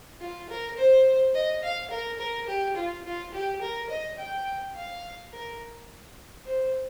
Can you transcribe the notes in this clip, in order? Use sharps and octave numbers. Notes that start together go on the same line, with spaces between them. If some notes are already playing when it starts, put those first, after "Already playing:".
F4
A#4
C5
D#5
F5
A#4
A#4
G4
F4
F4
G4
A#4
D#5
G5
F5
A#4
C5